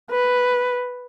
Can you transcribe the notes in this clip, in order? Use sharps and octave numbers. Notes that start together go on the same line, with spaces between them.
B4